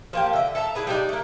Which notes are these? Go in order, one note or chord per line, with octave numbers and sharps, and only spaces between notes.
F3 A#3 G4
D3 E5
A4 E5 A5 A#5
D4 E4 G#4 B4
G3 D4 D#4
A3 A#3